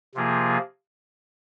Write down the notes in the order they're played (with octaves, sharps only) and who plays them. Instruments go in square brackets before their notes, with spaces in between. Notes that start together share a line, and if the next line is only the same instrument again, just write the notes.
[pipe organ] C3 F3 A#3 F4 G#4